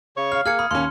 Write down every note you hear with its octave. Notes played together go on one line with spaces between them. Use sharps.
C#3 C#5 C#6
F5 F6
A#3 G#4 F6 G#6 C#7
B5 D#6
D#2 A#3 C#4 C6 F6